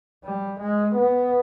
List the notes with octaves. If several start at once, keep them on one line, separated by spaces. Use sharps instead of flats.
G3
G#3
B3